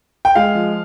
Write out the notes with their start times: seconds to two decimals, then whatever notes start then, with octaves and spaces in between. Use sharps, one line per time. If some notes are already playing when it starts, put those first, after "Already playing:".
0.25 G5
0.35 G#3 F5
0.55 F3